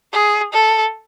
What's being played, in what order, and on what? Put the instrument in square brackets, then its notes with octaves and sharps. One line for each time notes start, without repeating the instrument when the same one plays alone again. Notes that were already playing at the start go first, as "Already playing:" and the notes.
[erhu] G#4
A4